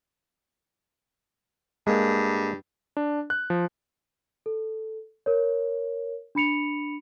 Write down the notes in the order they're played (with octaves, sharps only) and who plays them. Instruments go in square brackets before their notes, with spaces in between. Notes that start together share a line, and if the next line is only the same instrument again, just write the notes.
[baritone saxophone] G2 [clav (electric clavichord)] G#3 A#3
[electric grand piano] D4
F#6
F3
[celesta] A4
A#4 C#5
D4 B5 C#7 F7